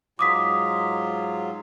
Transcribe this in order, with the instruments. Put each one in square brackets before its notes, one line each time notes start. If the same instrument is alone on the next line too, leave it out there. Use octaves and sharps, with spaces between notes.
[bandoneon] G#2 F#3 F4 [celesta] D6 D#6 B6